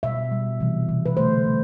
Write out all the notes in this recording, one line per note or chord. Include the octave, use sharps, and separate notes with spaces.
B2 G3 E5
B2 G3
C3 E3 G3
C3 E3 G3
B4
D3 A3 C5
D3 A3